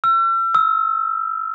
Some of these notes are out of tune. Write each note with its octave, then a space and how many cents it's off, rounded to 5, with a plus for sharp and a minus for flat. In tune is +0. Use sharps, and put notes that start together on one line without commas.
E6 +40
E6 -25